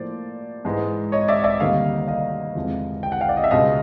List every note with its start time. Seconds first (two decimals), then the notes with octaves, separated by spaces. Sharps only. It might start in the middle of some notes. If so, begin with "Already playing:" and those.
Already playing: A2 F3 A#3 C5 D5
0.65 G#2 E3 G#3
1.12 C#5 D#5
1.28 D5 E5
1.44 D5 E5
1.60 D2 C3 D#3 G3 A#3 D#5 F5
2.08 D#5 F5
2.55 E2 C3 F3 G#3
3.03 G5
3.12 F#5
3.21 F5 G5
3.29 D5
3.37 D#5
3.44 E5
3.51 C#2 B2 G#3 D#5 F5